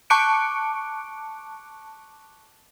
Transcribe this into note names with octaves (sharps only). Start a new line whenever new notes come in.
A5 C#6 D6 F#6 C#7 D7